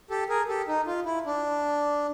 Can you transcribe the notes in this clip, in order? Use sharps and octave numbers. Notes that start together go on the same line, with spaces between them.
G4 A4
G#4 A#4
G4 A4
D#4
F4
E4
D4